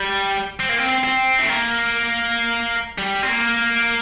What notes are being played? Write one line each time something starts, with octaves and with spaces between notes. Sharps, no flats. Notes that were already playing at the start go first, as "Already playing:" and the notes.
Already playing: G3
C4
A#3
C4
C4
C4
A3
A#3
G3
C4
A#3